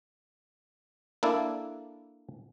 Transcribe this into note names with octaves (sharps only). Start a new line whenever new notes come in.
A#3 D4 E4 A4